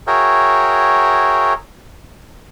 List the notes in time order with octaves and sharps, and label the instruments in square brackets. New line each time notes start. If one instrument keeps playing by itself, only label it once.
[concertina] F#4 G#4 A#4 C#5 E5 G5